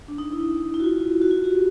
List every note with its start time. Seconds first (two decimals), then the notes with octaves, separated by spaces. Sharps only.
0.08 D4
0.18 D#4
0.32 E4
0.74 E4
0.80 F#4
0.84 F4
1.22 F#4
1.31 F4
1.44 G4